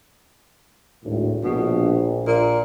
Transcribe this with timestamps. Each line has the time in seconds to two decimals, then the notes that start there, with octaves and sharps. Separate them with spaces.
1.04 G#1 D2 A2
1.44 A#1 B2
2.27 A#2